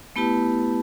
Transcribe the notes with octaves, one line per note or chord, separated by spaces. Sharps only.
A3 B3 E4 G4 B4 A5